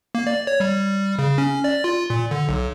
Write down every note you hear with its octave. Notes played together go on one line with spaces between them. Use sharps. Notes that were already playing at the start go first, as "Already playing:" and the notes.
A#3
D5
C#5
G3
C#3
C#4
D5
F4
A#2
D3
B1